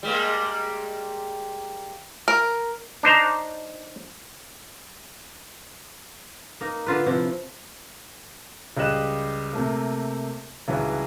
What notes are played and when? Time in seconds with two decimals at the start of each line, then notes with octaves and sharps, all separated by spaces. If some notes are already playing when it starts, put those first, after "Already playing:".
0.03 G3 G#3 A#3
2.28 A#4
3.03 D4 D#4 C5 A#5
6.61 A#3 D#4
6.86 D3 F4 B4
7.06 C3 F3 E4
8.77 C#2 G3 G4 D#5 F#6 E7
9.53 C3 A3 A#3
10.68 C#2 G2 E3 F#3